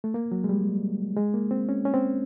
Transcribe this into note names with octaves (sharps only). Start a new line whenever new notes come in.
A3
A#3
F#3
G#3
G3
G#3
A#3
C4
C#4
C#4
C4